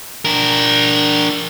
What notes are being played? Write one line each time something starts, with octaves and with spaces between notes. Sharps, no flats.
D4 A#4